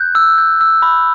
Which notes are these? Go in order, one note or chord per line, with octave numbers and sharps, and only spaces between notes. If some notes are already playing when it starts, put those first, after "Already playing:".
Already playing: F#6 G6
E6
G6
E6
B5